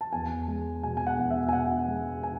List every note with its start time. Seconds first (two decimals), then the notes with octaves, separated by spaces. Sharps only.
0.01 A5
0.13 E2 G#5
0.48 G#3
0.83 B2 G#5
0.97 G#5
1.07 F#5
1.19 E2
1.31 E5
1.49 G#5
1.53 B2 F#5
1.88 G#3
2.23 G#5